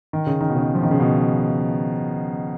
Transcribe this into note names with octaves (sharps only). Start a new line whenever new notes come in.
D#3
C#3
D#3
B2
C#3
F3
D#3
C#3
B2